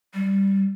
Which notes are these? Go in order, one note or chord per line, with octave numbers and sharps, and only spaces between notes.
G3